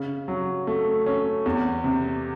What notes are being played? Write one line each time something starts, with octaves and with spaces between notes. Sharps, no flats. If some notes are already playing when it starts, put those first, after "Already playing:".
Already playing: C#3
F#3
A3
C#4
E2
C3